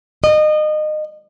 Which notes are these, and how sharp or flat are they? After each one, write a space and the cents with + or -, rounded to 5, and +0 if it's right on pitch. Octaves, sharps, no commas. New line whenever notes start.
D#5 -25